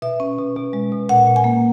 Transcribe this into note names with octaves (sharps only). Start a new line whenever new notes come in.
B2 E5
C#4
B2
B2
G#3
B2
A#2 F#5
A#2
G#5
A#3